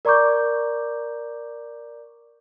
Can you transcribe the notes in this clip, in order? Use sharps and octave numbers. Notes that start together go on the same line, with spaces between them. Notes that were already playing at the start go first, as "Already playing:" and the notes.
A#4 D5 A#5 C#6 D6 G6